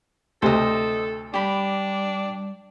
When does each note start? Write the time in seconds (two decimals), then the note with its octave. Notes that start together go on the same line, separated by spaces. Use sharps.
0.42 D2 C3 A4 C5 D#5
1.34 G3 D4 G4 B5